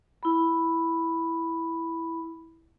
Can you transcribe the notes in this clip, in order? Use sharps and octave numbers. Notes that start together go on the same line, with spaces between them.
E4 B5